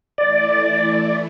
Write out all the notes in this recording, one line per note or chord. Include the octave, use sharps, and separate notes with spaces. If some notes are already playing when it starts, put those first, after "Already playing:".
E3 A3 E4 D5